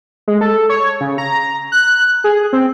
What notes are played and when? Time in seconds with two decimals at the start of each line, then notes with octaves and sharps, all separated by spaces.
0.28 G#3
0.41 A4
0.69 C#5
1.01 C#3
1.18 A#5
1.72 F#6
2.24 G#4
2.53 C4